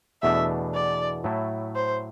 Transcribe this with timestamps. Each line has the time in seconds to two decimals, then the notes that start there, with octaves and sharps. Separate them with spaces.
0.22 E2 B2 A3 D4 E5
0.74 D5
1.24 A2 F#3 A3 E4
1.75 C5